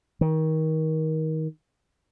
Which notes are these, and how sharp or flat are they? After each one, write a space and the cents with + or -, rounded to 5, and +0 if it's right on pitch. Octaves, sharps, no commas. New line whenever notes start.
D#3 +25